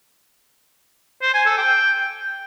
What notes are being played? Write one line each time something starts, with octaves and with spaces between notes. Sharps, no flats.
C5
G#5
A4
G5